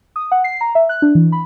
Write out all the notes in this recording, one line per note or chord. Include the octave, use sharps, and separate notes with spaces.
D#6
F#5
C7
A#5
E5
F#6
D4
E3
B5